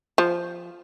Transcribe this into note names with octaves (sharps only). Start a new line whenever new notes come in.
F3